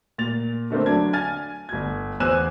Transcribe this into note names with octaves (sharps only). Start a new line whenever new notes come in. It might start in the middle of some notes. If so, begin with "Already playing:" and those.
A#2 A6 F7
D3 A3 A#3 C4
D3 F#3 D4 A5 G#6
G#5 F6 G#6 A6
G1 G#6
E2 C5 G#5 E6 F#6 E7